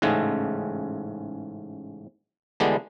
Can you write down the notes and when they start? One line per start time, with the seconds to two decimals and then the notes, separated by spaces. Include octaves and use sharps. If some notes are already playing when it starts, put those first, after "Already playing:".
0.02 A1 G#2 C#3 G#3 A3
2.60 D3 E3 G3 G#3 B3 D4